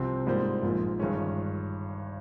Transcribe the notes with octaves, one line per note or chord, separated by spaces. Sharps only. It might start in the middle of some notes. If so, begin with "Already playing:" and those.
Already playing: C2 C3 F3 C4
G#2 G3 A#3 F4 C5
A#1 G#2 F3 A#3 F4
G1 G2 D#3 G#3 C#4